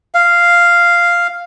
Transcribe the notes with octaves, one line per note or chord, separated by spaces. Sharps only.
F5